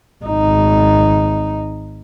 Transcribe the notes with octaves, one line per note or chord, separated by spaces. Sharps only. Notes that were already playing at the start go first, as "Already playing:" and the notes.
G#1 D#4